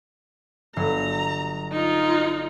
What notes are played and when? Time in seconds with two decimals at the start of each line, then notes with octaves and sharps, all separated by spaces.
0.76 G1 F#3 A#5 C6
1.71 D#4 F4